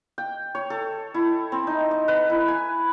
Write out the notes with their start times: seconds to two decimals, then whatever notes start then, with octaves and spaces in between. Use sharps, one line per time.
0.18 G5
0.55 C#5
0.70 A4
1.14 E4
1.52 C4
1.67 D#4
1.91 D#5
2.08 B4
2.30 E4
2.48 G#5